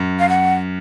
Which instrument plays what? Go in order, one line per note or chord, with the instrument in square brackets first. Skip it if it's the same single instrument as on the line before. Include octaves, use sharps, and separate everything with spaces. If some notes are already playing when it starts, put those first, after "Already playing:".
Already playing: [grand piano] F#2
[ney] F5
F#5